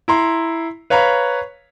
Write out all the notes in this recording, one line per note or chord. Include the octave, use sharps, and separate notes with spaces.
E4 A#5 C6
B4 C#5 F5 A#5 B5